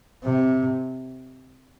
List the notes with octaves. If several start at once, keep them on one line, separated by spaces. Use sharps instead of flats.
C3